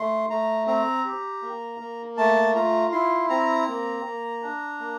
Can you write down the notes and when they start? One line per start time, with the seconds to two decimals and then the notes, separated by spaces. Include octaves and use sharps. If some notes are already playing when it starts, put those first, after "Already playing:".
Already playing: A3 C6
0.29 A3 A#5
0.67 C4 A#5
1.05 G4
1.42 A#3
1.80 A#3
2.17 A3 A5
2.55 F4 A#5
2.92 E4 C6
3.29 C4 A#5
3.67 A#3
4.05 A#3
4.42 D4
4.80 A#3